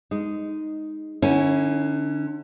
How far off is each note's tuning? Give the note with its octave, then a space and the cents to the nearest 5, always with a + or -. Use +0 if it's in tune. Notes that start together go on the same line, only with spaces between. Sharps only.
G#3 -10 D#4 +0
D3 +35 C#4 +0 E4 -45